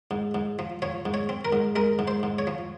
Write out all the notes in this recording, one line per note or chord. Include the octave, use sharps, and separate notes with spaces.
G#2
G#2
F3
F3 C#5
G#2
C#5
C4
A#4
G#2
G#3 A#4
G#2
C5
G#2
C#5
F3